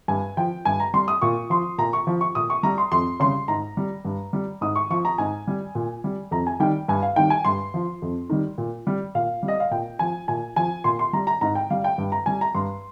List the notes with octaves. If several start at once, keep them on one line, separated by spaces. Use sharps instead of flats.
G2 G#5
F3 G5
G2 G#5
A#5
G3 C6
D#6
A#2 C#6
F3 C6
A#2 A#5
C#6
F3
C#6
A#2 D#6
C#6
G3 A#5
C6
F2 C6
C#3 G3 C6
G#2 A#5
G3
G2
G3
G#2 D#6
C#6
F3 C#6
A#5
G#2 G#5
G3
A#2
G3
F2 A#5
G#5
D#3 G3 G5
G2 G#5
F5
D#3 G3 G5
G#5
G2 C6
F3
F2
D#3 G3
A#2
G3
A#2 F5
G3
D#5
F5
A#2 G5
F3 G#5
A#2 G#5
F3 G#5
A#2 C6
C6
G3 A#5
A#5
G#2 A#5
G5
G3 F5
G5
G2
A#5
G3 G#5
A#5
G2 C6